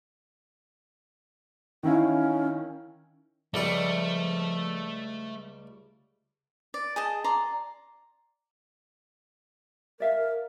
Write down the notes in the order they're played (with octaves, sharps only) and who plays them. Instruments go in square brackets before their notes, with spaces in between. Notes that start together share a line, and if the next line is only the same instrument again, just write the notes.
[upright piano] D#3 E4 F5 [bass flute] C#4
[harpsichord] C#2 G3 D5 [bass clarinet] F3 [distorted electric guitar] A3
[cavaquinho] D5
G#4 D#5 A5
D5 A#5 C6
[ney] A#4 [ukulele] D5 E5 F5